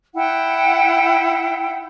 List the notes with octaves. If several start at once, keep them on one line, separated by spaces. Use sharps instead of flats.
E4 F#5 G5